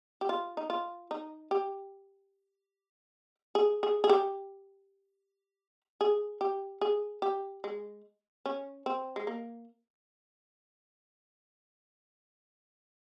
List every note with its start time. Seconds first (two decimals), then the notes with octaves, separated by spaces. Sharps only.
0.21 G4
0.29 F4
0.57 D#4
0.70 F4
1.11 D#4
1.51 G4
3.55 G#4
3.83 G#4
4.04 G#4
4.09 G4
6.01 G#4
6.41 G4
6.81 G#4
7.22 G4
7.64 G#3
8.46 C#4
8.86 C4
9.16 G#3
9.27 A#3